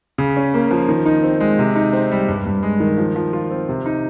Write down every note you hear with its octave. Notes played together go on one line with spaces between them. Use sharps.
C#3
C#4
A#3
F3
D#3
D#4
C4
G#3
C3
D#4
C4
G3
G2
G2
G#3
D#3
F3
F3
F4
C4
C3
D#4